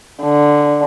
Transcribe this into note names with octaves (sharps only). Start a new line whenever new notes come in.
D3